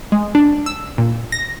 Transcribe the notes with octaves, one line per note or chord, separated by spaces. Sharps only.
G#3
D4
E6
A#2
A#6